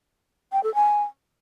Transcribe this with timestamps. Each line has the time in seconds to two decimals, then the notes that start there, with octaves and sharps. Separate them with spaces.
0.52 G5
0.63 A4
0.75 G#5